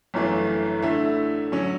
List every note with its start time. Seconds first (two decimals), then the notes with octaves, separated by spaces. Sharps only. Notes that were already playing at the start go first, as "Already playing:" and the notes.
0.14 G1 F#2 E3 A3
0.82 D3 A3 E4
1.52 D3 F#3 C#4